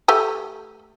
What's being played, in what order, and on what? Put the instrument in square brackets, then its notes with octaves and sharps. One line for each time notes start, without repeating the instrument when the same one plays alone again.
[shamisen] A3 G4 G#5